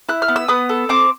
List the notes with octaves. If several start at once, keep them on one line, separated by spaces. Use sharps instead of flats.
E4 F#6
F6
B3
E6
B3 D#6
A4
C4 D6